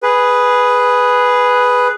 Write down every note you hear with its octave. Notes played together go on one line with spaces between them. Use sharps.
G#4 B4